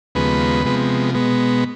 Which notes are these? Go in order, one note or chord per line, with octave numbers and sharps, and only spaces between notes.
D#2 C#3 F3 G#3 B3 B4
C3 F3 G#3 B3
B2 G#3 B3